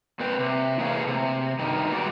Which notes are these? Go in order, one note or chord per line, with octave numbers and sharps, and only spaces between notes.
A#2 C4 B4 C5 G5
C3
A2 E3 A#3 G#4 C#5 F5
C3
G2 D#3
G2 A#2 G3 G#3 F#4 D5